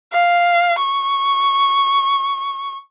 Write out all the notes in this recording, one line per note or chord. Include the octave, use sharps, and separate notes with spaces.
F5
C#6